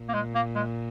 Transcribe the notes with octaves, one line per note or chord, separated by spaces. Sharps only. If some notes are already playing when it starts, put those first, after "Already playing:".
Already playing: A#2
A#3
G#3
A#3
G#3